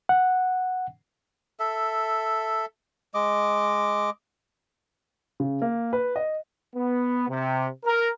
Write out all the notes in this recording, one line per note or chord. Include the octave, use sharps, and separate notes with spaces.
F#5
A4 E5
G#3 D#5 D6
C#3
A#3
B4
D#5
B3
C3
A#4